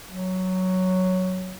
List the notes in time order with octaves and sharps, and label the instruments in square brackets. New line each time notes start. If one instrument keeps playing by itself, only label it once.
[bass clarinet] F#3